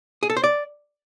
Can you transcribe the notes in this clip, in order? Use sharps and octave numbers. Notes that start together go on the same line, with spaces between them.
G#4
A4
C5
D5